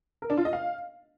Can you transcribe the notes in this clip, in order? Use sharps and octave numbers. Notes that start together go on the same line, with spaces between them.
A#4
D4
F4
D#5
F5